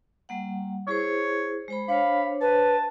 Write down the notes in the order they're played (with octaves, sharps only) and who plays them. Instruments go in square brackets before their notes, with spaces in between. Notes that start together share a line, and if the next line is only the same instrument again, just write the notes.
[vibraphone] G3 A#3 F#5
[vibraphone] E4 G#4 C5 [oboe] C#5
[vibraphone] G#3 C5 B5
[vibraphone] D4 C5 C#5 [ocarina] F5 [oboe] B5
[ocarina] B4 [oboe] A5